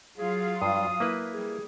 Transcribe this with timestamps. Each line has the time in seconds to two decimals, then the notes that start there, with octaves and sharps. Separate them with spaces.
0.17 F#3 F4 G#4 F5
0.62 G2 D#6
1.00 A#3 E4 B4
1.33 G3 G#4